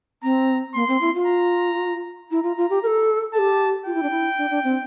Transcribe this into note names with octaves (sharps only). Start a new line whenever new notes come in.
C4 A#5
A#3 C6
C4
E4
F4
A#5
E4 A#5
F4
F4
G4
A#4
A4
A4 A5
G4
F4 G5
E4
D4
E4
D4
D4
C4